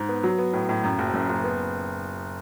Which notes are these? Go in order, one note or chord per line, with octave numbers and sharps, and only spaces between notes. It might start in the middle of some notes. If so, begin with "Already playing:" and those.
Already playing: G#2
B3
F#3
B3
A2
A2
F#2
F#1
F#2
F#1
B3